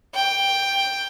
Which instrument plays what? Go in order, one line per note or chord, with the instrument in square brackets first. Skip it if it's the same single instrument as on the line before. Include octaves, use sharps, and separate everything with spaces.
[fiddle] G5